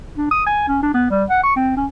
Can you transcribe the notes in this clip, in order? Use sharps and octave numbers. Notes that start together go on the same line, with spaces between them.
D4
D#6
G#5
C#4
D4
B3
G3
F#5
C#6
C4
C#4